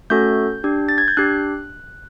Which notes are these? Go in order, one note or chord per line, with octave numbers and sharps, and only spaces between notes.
A3 C#4 F#4 A4 G6
D4 G4
A6
G#6
G6
D4 G4 F#6